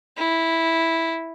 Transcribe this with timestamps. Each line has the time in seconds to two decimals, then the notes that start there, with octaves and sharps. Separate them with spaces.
0.17 E4